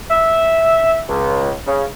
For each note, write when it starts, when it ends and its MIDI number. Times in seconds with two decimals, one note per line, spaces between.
0.11 1.01 76
1.09 1.51 37
1.67 1.85 49